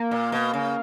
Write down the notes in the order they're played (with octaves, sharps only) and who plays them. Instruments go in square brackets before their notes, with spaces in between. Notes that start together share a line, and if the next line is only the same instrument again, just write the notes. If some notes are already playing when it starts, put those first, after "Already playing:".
Already playing: [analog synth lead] A#3
[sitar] A#2
B2
C#3